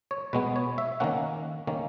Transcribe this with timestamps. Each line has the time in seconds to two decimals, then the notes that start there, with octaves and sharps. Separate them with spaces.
0.11 C#5
0.33 B2 G#3 B3 B4
0.56 C#5
0.78 E5
1.00 D#3 A#3 C#4 F#5
1.67 D#3 A#3 C#4